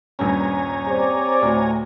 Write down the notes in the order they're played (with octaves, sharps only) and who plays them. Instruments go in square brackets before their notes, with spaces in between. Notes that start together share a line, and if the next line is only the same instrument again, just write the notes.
[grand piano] D#1 G2 C#4 [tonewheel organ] C#5 G#5 A#5
[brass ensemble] C4 D5 [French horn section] G4 C5
[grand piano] D2 [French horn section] A2